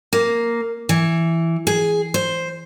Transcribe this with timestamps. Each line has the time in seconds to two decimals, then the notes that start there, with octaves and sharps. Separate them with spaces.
0.13 A#3
0.89 E3
1.67 G#4
2.14 C5